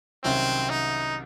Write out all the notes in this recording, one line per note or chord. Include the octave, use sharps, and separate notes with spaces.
C2 C3 D#3 F#3 C4 C#4
D#4